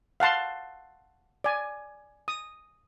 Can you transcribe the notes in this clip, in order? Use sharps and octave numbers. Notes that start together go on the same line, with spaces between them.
F5 F#5 A5 C6
D5 G#5
D#6